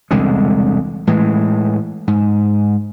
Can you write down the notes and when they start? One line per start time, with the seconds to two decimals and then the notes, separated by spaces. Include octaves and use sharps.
0.11 E1 C2 D3 G#3
1.07 A2 E3 G#3
2.08 G#2